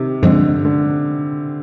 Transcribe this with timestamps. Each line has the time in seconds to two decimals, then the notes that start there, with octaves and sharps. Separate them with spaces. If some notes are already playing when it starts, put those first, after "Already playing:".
Already playing: C3 D#3
0.22 G2 D3 F3 G#3 C4
0.65 D3